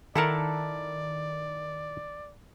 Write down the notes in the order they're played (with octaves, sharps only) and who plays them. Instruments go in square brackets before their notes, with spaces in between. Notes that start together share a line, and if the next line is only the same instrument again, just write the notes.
[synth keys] D#3 [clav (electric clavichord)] E4 A#4 [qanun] A4 F#5 A5 [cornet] D5